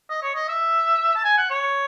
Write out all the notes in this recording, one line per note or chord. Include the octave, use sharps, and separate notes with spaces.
D#5
C#5
D#5
E5
A5
G#5
F#5
C#5